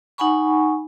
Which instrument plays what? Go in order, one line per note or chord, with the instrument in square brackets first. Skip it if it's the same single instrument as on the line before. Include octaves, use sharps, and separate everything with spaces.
[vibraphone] D#4 F#5 G#5 B5 C#6